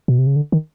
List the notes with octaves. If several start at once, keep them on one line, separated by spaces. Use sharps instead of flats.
B2
C3
C#3
D3
D#3